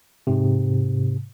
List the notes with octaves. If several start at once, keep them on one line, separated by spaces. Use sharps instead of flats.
G#2 C3